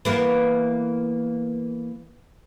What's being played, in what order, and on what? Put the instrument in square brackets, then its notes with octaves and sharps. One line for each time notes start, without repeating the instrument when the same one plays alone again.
[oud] E3 A#3 B3